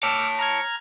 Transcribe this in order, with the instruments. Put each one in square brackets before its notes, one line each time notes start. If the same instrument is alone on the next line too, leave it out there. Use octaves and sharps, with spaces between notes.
[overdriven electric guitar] C#5 A5 [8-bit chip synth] D6 E6 F6
[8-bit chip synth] A#5 F6 G#6